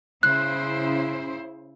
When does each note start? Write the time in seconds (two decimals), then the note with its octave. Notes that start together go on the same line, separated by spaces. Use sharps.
0.23 C#3 E4 C5 F#6